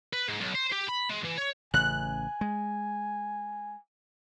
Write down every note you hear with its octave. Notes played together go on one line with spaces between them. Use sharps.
B4
G#2
B1
C5
G4
B5
G#3
E3
C#5
A1 C#3 G#5 F#6
G#3